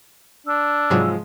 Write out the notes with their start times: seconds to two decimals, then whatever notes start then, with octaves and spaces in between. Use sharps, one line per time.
0.47 D4 E6
0.90 G#2 C3 F3 F#3 G#3